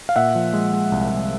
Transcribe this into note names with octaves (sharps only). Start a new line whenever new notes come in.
F5
A#2 E5 F#5
F3
G#3
G#3
C2
C2